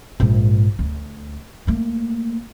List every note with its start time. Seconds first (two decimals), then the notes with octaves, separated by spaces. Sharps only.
0.20 A#1 G#2
0.79 D2
1.67 A3 A#3